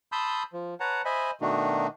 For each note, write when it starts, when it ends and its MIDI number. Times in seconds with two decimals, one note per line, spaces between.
0.12 0.43 81
0.12 0.43 83
0.12 0.43 84
0.12 0.43 87
0.12 0.43 88
0.12 0.43 91
0.53 0.74 53
0.80 1.02 71
0.80 1.02 73
0.80 1.02 78
0.80 1.02 81
0.80 1.02 82
1.05 1.31 72
1.05 1.31 75
1.05 1.31 76
1.05 1.31 80
1.05 1.31 83
1.41 1.87 47
1.41 1.87 51
1.41 1.87 57
1.41 1.87 62
1.41 1.87 63
1.41 1.87 66